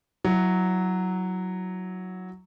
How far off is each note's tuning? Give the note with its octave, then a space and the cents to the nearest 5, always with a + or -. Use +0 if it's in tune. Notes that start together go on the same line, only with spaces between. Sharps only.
F#3 +0 E4 +0